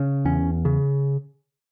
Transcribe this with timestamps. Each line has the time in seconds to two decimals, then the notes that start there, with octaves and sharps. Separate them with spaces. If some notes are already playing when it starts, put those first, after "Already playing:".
Already playing: C#3
0.25 E2 C#4
0.65 C#3